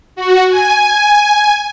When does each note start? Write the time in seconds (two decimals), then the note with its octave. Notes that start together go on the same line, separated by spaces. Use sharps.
0.16 F#4
0.50 G#5